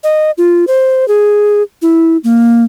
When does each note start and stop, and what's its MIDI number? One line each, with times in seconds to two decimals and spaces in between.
0.04 0.31 75
0.38 0.65 65
0.67 1.07 72
1.08 1.63 68
1.82 2.17 64
2.24 2.64 58